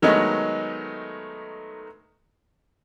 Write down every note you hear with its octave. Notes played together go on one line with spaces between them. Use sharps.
D#3 F#3 G#3 A3 B3 D#4